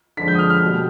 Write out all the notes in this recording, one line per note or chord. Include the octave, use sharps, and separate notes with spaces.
D3 F3 G#3 B6
G6
D#6
F6
F6
B2 G3